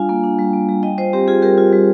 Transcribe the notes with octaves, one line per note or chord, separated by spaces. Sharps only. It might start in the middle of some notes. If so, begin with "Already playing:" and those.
Already playing: G3 D4 F4 F5 G#5
A#3
D4
G3
A#3
G3
G3 D#5 G5
F4 C5 D#5
C4 G4
F4 G#4
G3 G4 A#4
F4
G3